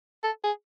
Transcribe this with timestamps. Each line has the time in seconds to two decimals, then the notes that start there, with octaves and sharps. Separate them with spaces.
0.23 A4
0.44 G#4